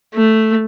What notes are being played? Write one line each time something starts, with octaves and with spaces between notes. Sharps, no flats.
A3